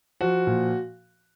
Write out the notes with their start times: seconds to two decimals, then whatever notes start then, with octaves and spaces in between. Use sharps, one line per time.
0.21 F3 F#4
0.47 A#2